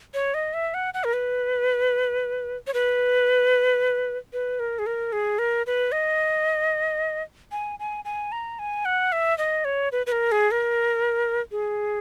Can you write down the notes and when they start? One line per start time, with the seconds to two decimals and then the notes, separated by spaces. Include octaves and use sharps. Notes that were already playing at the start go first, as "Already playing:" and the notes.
0.14 C#5
0.34 D#5
0.54 E5
0.74 F#5
0.94 F#5
1.04 A#4
1.13 B4
2.67 C#5
2.74 B4
4.33 B4
4.60 A#4
4.79 G#4
4.86 A#4
5.12 G#4
5.39 A#4
5.66 B4
5.92 D#5
7.52 G#5
7.79 G#5
8.05 G#5
8.32 A#5
8.59 G#5
8.85 F#5
9.12 E5
9.38 D#5
9.65 C#5
9.92 B4
10.06 B4
10.12 A#4
10.32 G#4
10.51 A#4
11.51 G#4